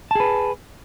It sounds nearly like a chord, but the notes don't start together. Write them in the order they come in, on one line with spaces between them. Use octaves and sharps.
A5 G#4 B4